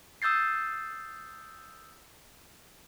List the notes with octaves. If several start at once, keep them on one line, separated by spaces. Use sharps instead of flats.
D#6 E6 G6 A6 C7